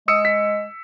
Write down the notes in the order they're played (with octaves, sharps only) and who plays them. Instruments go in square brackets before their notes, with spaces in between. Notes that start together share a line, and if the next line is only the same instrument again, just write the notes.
[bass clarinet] G#3 [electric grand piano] D#6 E6 C#7
[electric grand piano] B6